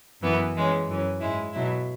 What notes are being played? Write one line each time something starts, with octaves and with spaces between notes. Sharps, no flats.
F#2 E3 B3 E4
E3 G#3 C#4
F#2 E3 C#4
G#2 G#3 E4
B2 F#3 E4